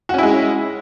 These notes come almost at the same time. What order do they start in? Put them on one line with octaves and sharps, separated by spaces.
F#4 C#4 E4 G#3